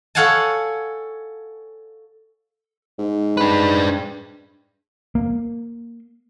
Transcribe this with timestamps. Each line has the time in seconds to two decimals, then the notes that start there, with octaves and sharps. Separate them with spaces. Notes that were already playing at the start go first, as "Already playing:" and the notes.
0.15 A4 C#5 F5 F#5 G#5 A5
2.99 G#2
3.37 D4 B4
5.15 A#3